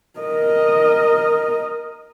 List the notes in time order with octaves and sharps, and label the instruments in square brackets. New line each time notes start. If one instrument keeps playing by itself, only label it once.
[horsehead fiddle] A#4 D#5